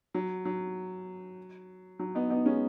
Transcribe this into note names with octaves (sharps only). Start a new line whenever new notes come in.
F#3
F#3
F#3
B3 D#4
B3 D#4
G#3 C#4